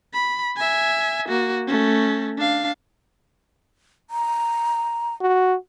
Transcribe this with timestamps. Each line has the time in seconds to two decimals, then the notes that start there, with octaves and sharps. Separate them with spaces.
0.14 B5
0.57 E5 G#5
1.29 A#3 F#4
1.67 A3 C#4
2.37 D4 F5
4.10 A#5
5.21 F#4